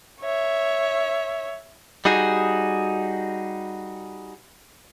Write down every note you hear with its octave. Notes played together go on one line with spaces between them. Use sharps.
C#5 E5
G3 D#4 F#4 G#4